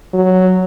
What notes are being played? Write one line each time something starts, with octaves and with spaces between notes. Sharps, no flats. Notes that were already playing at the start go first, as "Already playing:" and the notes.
F#3